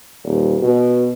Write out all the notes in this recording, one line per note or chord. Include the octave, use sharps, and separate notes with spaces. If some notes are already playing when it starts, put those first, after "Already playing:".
D#1
B2